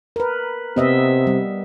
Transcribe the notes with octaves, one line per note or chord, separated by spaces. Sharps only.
A#4 B4
C3 B3 D#5 E5
G3